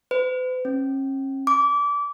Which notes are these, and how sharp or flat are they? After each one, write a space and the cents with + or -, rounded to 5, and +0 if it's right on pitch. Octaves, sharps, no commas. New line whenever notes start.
B4 +45
C#4 -40
D6 -25